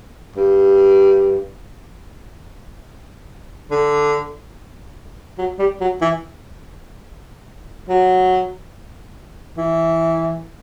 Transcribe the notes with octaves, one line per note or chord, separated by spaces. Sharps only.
G2
D3
F#3
G3
F#3
E3
F#3
E3